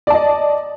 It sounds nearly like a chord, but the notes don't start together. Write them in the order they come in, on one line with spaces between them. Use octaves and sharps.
D5 A5 D#5